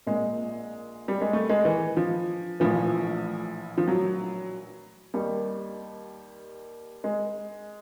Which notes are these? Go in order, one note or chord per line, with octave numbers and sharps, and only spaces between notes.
A#1 A#2 G#3
G3
G#3
A3
G#3
E3
F3
A#1 A2 E3 F3
F3
F#3
D#2 D#3 G3
G#3